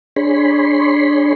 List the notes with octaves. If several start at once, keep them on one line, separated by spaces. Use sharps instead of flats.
D4 G#4 C#5 B5 C6